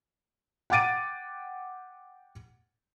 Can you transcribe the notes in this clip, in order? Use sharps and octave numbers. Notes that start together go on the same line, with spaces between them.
F#5 G5 D6 A6 D7 D#7